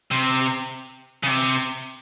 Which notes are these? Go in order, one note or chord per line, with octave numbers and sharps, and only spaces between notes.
C3
C#3
C3